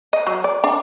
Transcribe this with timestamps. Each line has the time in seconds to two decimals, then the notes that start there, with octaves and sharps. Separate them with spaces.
0.13 D#5
0.27 F#3
0.44 D5
0.64 D4